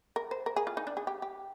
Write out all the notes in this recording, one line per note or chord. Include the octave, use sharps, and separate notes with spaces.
A#4
C5
A#4
G#4
F4
D#4
D4
G#4
G4
G4